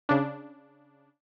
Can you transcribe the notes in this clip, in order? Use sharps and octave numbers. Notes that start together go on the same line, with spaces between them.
C#3 D4